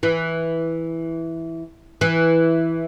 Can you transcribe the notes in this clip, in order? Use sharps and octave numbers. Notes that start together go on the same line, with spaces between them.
E3
E3